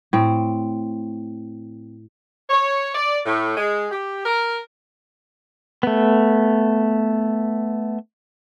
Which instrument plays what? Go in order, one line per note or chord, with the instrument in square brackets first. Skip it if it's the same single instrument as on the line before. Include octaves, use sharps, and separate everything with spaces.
[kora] A2 C4
[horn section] C#5
D5
A2
G#3
G4
A#4
[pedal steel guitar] A3 B3